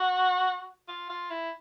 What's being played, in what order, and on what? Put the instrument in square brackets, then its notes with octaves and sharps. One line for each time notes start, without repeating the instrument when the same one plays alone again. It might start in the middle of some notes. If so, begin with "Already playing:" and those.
Already playing: [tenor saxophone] F#4
F4
F4
E4